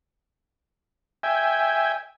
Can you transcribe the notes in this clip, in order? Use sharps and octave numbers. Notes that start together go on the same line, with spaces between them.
E5 G5 G#5